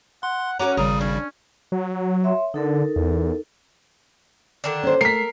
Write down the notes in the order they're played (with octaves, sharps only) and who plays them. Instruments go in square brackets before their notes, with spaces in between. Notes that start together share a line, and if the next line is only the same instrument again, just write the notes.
[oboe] F#5 [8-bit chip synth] C6
[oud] C#4 F#4 A#4 [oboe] F#5 [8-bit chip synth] A#5 D6
[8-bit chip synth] G#1 C#3 G3 [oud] A#4 [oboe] D#6
[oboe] C#4 [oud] D4
[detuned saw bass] F#3
[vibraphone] C#5 E5 C6
[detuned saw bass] D3 [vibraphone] D#4 A4 A#4
[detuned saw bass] E2
[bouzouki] D3 D#3 D4
[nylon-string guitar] C#4 C5
[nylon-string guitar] A3 [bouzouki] A#4 [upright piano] B6 C7